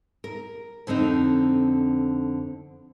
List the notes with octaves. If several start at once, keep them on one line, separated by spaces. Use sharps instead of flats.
A#4
F2 D3 C4 D#4